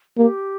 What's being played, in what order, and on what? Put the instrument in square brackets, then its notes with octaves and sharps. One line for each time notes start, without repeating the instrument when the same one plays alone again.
[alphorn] A#3 [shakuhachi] G4